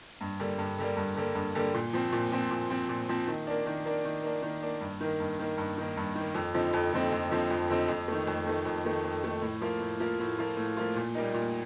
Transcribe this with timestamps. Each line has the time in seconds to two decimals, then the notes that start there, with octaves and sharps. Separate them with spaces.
0.21 G2
0.39 D3 G3 A#3
0.59 G2
0.78 D3 G3 A#3
0.97 G2
1.16 D3 G3 A#3
1.35 G2
1.55 D3 G3 A#3
1.74 A#2
1.93 F3 C4
2.12 A#2
2.32 F3 C4
2.51 A#2
2.70 F3 C4
2.89 A#2
3.09 F3 C4
3.28 D#3
3.47 A#3 D4
3.66 D#3
3.85 A#3 D4
4.05 D#3
4.23 A#3 D4
4.42 D#3
4.62 A#3 D4
4.81 G2
5.01 D#3 A#3
5.20 G2
5.39 D#3 A#3
5.58 G2
5.78 D#3 A#3
5.97 G2
6.15 D#3 A#3
6.35 F2
6.54 D3 F3 C4 D#4
6.73 F2
6.92 D3 F3 C4 D#4
7.12 F2
7.31 D3 F3 C4 D#4
7.50 F2
7.70 D3 F3 C4 D#4
7.88 F2
8.08 D#3 A3
8.27 F2
8.46 D#3 A3
8.65 F2
8.85 D#3 A3
9.04 F2
9.24 D#3 A3
9.42 A2
9.61 F3 A#3 F4
9.80 A2
10.00 F3 A#3 F4
10.20 A2
10.38 F3 A#3 F4
10.57 A2
10.77 F3 A#3 F4
10.96 A#2
11.15 G3 A#3 D#4
11.34 A#2